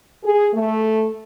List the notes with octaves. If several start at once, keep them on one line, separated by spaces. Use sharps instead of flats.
G#4
A3